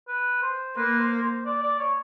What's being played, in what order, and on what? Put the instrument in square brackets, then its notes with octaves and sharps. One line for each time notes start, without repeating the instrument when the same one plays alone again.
[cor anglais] B4
C5
[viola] A#3 [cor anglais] B4
[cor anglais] C5
C5
D5
D5
C#5